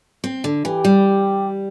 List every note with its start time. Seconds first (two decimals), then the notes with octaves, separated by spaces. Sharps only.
0.24 C4
0.44 D3
0.65 E3 G4
0.85 G3